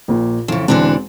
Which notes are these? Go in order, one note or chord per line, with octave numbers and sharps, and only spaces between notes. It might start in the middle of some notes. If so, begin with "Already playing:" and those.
A#1 A#2
F2 C#3 E3
E1 D3 E3 C4 D4